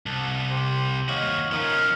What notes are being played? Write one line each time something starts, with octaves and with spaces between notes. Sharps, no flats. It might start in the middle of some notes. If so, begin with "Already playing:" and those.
C2 A5
G4 C5
D#2 F#4 C#5 D#5 F5
F3 C#4 D#4 A#4 F5